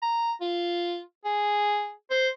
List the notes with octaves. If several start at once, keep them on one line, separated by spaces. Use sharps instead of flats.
A#5
F4
G#4
C5